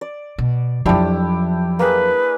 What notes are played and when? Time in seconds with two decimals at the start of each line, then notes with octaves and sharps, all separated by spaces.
0.01 D5
0.38 B2
0.86 F2 F3 F#3 D4 E4 G4
1.79 A#3 G#4 B4